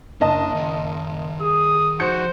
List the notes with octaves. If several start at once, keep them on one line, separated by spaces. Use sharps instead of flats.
F#1 D4 D#5 A5
D#3 F#5
G#4 D#6
F3 D#4 F#4 C5 G6 C#7